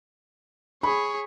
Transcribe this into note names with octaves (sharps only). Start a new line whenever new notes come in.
G#4 C#5 B5